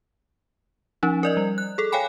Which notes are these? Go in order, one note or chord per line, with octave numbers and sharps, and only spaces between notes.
F3 C#4 D#4
A#4 D5 D#5
G3
F#6
G#4 A4
C#5 F5 G5 G#5 B5